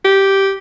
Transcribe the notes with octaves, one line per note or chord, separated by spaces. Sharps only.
G4